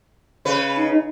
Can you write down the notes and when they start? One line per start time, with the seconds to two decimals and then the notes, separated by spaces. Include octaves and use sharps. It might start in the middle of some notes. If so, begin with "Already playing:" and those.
0.45 C#3 B4
0.77 D#4